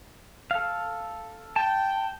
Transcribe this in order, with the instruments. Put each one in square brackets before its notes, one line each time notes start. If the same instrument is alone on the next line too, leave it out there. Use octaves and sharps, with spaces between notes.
[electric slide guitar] A4 F5
[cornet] G5 [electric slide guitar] A5